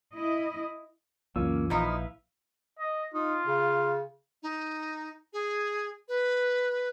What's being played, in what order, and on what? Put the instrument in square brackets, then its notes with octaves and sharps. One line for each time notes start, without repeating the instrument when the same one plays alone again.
[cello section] E4 D#5
[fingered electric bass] C#2 F#2 [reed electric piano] E3 F4 E6 [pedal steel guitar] A#3 C#4
[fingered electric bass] A#1 [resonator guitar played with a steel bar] F3 D#4 [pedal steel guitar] E4 B4 F5
[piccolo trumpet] D#5
[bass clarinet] D#4 [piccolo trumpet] F4
[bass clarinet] C#3
[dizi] D#4
G#4
B4